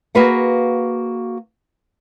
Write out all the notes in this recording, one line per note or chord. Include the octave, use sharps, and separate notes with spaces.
A#3 F#4 G#4 B4 F5 F#5